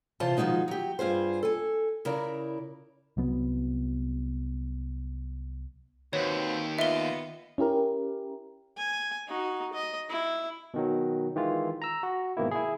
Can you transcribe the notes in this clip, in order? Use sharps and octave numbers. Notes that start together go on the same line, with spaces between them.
C3 E3 F4 C5 A5
D#3 F3 G3 G#3 D#4 F#4
F#3 G4
G2 F4 G#4 C5
A4 G#5
C#3 E4 A#4 D5 A#5
C2 F#3 B3
D#2 C4 F#4 B4 C#5
B3 F4 D#5 E5 G7
C#4 E4 G4 A#4
G#5
D#4 F#4
D#5
E4
B2 D#3 F#3
D#3 E3 G#3 F4
A#5 E6
F#4
G#2 B2 D#3 A#3 E4
E4 G#4